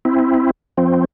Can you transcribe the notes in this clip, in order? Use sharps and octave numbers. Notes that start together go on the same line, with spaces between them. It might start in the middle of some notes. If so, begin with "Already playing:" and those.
C4 E4
F3 C4